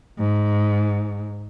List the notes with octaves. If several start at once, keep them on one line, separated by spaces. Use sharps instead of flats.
G#2